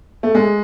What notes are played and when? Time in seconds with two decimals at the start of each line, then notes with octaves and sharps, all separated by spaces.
0.23 A3
0.35 G#3